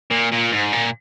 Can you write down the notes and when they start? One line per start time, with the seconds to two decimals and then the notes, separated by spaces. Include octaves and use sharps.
0.11 A#2
0.32 A#2
0.52 G#2
0.73 A#2